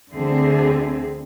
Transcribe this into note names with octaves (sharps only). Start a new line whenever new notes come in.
D2 D3 C4 G#4 E5